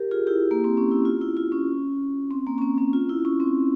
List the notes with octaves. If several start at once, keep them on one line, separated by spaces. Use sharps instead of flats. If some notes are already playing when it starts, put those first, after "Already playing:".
Already playing: G4 A#4
F4 G#4
E4 G4
A#3
C4
C#4
E4
F4
E4
F4
C#4
C4
A#3
C#4
C4
C#4
F4
E4
C#4
C4